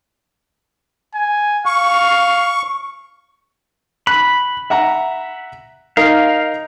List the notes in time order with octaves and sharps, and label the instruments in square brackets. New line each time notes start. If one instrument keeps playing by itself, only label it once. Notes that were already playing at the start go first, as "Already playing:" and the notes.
[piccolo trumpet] G#5
[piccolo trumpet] F5 [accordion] C#6
[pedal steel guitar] B5 [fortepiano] F#6
[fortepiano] E5 F#5 A#5
[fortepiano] D#4 A#4 [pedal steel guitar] F5